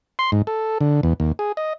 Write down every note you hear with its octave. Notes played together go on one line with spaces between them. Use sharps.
C6
G#2
A4
D3
E2
D#2
G#4
D#5